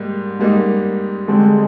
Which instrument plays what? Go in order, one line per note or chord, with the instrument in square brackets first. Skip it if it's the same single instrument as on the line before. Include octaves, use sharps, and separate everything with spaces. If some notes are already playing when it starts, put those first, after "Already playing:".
Already playing: [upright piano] G#2 G3 A#3 D#4
[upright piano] G#2 G3 A#3 D#4 [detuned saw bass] G#3
[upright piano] D3 G3 C4 [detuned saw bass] G#3